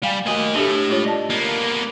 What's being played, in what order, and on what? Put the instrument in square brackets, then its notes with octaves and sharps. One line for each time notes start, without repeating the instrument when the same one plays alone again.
[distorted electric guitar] G3 [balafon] F5 G#5
[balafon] A3 F#4 G#5 [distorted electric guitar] A#3 D#5
[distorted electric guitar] A2 A3 [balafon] D4 G4 A4
[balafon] G#3 F4 C#5
D5 D#5 A5
[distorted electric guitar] A#3 B3